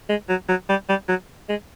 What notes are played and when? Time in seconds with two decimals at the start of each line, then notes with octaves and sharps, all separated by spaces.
0.09 G#3
0.29 F#3
0.49 F#3
0.69 G3
0.89 G3
1.08 F#3
1.49 G#3